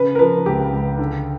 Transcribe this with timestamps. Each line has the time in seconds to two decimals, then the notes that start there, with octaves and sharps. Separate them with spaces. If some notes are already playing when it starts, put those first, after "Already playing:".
Already playing: C#3 B4
0.15 A#4
0.19 F3 B4
0.46 C#2 G4
0.73 C#2
0.99 D3